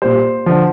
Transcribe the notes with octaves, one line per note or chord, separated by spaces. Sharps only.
A#2 G3 C5
D3 F3